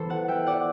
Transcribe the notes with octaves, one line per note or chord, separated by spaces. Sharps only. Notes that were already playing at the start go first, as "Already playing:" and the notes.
Already playing: E3 B3 A4 C5
F#5 A5
E5 G5
D5 F#5